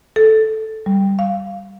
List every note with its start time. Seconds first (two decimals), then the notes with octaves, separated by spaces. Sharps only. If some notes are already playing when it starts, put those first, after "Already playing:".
0.16 A4
0.86 G3
1.19 F5